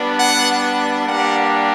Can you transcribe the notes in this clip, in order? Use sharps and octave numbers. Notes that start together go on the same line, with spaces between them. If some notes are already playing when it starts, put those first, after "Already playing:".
Already playing: G3 B3 D4
F#5
G3 A#3 D4 G4 F#5